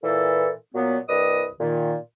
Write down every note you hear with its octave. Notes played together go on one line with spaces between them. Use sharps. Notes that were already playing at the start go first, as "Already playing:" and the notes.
A#2 E3 A4
A#2 F#3 B3
C2 G2 B4 D5 D#5 D#6
A#2 D#3